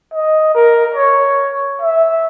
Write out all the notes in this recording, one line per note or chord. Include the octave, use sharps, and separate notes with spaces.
D#5
A#4
C#5
E5